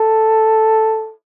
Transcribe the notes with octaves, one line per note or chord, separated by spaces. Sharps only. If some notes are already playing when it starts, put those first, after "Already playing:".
Already playing: A4